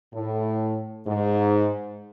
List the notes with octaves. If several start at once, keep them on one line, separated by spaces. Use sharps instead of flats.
A2
G#2